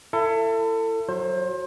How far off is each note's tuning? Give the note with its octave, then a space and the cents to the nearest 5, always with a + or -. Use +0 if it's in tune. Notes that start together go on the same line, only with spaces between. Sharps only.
E4 +25 A4 +30
F#3 +0 C5 +30